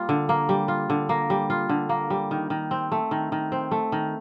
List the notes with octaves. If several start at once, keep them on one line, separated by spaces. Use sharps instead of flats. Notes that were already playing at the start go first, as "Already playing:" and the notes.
Already playing: G3 A#3 F4
D3
A#3
G3
F4
D3
A#3
G3
F4
D3
A#3
G3
D#3
D#3
C4
A3
D#3
D#3
C4
A3
D#3